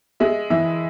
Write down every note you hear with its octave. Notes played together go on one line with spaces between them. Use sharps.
G#3 E5
E3 E5